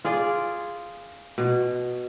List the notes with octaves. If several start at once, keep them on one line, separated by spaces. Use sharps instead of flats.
F4 G#4 D5
B2